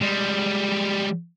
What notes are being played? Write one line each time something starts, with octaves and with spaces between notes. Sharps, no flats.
G3 G#3